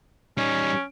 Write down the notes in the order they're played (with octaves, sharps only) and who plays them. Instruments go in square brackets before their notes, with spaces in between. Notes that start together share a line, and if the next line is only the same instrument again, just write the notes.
[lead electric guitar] G3 D#4 [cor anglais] C#4